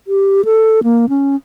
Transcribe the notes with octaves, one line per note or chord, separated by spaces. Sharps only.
G4
A4
A#3
C#4